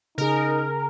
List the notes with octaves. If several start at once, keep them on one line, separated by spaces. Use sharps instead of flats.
C#3 D#4 G#4 A#4